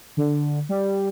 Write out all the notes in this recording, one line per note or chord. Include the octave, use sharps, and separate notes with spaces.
D3
G3